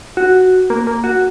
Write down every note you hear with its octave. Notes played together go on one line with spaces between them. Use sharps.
F#4
A#3
A#3
F#4